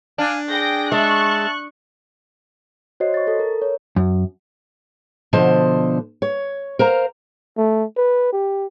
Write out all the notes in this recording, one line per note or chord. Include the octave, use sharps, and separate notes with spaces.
D4 F5 G#5
G#4 G5 A#6
G#3 E5 A5 C#6 F#6
F#4 C5 C#5 D#5 C7
C#6 A6
A4
A#4
C#5
F#2
B2 D3 F3 C5 D#5 A5
C#5
A#4 C5 F5 A#5
A3
B4
G4